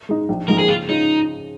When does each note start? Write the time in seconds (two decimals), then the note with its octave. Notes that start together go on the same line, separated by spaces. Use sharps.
0.09 G#3 D#4
0.29 A#1
0.48 G#2 F3 A#3 D#4 A#4
0.59 G#4
0.68 C#3 F4
0.88 G#3 C#4 D#4 F4